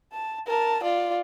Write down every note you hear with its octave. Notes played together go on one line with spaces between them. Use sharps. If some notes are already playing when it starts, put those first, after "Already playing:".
A5
A#4 A5
F4 D5